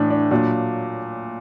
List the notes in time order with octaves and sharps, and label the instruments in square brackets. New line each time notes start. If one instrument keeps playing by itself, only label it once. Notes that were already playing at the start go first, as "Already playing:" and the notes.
Already playing: [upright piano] A2 E3 D4
D4
A#2 F#3 D4